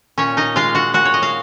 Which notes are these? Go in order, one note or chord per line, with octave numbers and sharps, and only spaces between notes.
A#2 C#4 C#5
D#4 D#5
G#3 F4 F5
F#4 F#5
A#2 F#4 F#5
C#5
D#5
F5